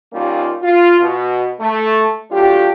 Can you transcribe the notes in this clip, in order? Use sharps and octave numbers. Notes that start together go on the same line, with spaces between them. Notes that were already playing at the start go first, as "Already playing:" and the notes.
D#2 D#3 G3 A#3 C#4 F4
F4
B2
A3
F#3 A3 D4 F4 G4